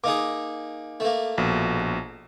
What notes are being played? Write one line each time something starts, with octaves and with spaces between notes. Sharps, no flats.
A#3 D#4 G#4 D6
A3 A#3
A#1 B2